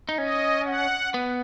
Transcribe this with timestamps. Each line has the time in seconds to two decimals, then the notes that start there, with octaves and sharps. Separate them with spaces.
0.09 D#4
0.18 C#4 D#5
0.66 F#5
1.14 B3